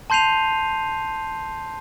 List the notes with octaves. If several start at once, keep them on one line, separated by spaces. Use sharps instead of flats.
A5 C6 G6 C7 D#7 F7